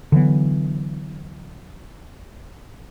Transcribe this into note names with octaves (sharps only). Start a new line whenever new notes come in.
D3 E3 F#3 B3